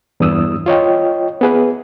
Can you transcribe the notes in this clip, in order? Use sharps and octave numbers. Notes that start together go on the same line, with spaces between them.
E2 G2 D#6 E6
F4 C#5 D#5 G5
B3 G#4 B4